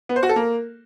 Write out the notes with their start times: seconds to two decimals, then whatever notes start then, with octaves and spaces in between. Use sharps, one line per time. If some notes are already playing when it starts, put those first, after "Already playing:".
0.09 B3
0.16 C5
0.23 F#4
0.29 A4
0.36 A#3